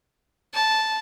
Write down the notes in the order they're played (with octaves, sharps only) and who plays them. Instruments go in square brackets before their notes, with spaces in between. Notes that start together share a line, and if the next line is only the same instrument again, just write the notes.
[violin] A5